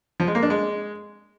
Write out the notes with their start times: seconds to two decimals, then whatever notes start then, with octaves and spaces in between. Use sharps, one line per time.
0.20 F3
0.27 G#3
0.35 A#3
0.43 D4
0.50 G#3